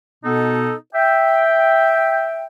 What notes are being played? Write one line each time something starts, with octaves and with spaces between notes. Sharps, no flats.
B2 B3 D#4 A4
E5 G5